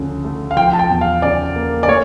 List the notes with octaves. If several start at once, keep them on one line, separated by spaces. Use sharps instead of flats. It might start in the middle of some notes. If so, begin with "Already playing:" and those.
Already playing: D2 C#3 F3
A3
F5
F3 G5
A5
G5
E2
F5
C#3 D5
A#3
D5
A3 C#5